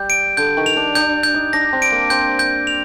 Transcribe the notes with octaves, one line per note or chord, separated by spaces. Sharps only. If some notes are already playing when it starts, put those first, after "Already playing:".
Already playing: G3 G6
D7
D3 G6
D#3
F7
D4
D4 G6
G6
D#4
D4 A#6
C4
D7
A#3
C4 G6
G6
F7